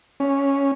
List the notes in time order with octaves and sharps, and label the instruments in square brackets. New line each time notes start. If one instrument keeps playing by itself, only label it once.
[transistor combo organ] C#4